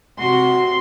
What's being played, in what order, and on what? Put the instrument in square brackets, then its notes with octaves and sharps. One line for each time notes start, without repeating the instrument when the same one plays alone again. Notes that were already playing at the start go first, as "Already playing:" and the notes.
[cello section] C3 F#4 [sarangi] C6